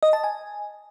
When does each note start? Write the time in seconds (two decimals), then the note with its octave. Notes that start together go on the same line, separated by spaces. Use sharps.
0.03 D#5
0.13 A5
0.24 G#5